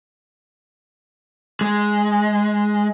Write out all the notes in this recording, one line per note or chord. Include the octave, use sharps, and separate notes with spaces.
G#3